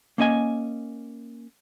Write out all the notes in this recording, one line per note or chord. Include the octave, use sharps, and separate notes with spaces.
A#3 C#4 D#5 G#5